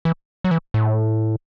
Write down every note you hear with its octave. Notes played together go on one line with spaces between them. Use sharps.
E3
F#3
E3
A2